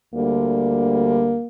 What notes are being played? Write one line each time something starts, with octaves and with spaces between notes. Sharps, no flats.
D2 D3 G3 A#3